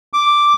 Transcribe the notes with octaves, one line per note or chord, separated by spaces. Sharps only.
D6